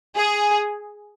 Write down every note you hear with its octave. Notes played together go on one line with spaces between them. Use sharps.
G#4